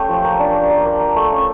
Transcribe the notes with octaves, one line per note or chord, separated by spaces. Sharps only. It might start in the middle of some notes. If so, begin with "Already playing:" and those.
Already playing: A3 C#4 G4
F3
A#3
D4
A#3
A#3
A#3
A#3
A3
C#4